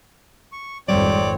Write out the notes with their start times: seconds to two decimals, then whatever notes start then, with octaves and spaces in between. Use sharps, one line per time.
0.52 C#6
0.88 G#1 F2 G3 C4 C#5 D5